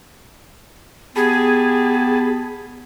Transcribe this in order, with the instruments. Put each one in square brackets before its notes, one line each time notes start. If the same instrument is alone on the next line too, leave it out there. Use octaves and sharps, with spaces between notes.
[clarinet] B3 [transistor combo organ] G4 A5 B5 [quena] G#4